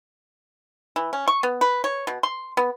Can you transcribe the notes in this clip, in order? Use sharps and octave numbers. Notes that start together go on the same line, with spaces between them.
E3
C#4
C#6
B3
B4
C#5
B2
C6
B3